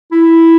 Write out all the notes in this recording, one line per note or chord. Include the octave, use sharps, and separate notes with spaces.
E4